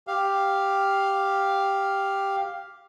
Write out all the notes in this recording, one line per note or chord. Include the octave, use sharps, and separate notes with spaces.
G4 F5